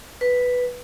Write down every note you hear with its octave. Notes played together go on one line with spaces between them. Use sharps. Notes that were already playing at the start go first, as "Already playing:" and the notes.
B4